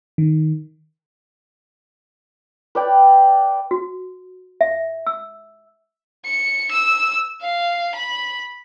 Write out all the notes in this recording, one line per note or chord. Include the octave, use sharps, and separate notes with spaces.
D#3
B4 D5 G5
F#4
E5
E6
C#7
E6
F5
B5